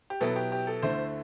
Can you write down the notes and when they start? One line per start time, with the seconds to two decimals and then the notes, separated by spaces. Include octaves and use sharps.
0.10 G4
0.20 B2 F#3 B3 E4 A4
0.36 G4
0.52 G4
0.67 A4
0.82 D2 D3 A3 E4 C5